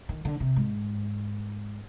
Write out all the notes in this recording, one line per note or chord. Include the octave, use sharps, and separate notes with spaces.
D#3
D3
C3
G#2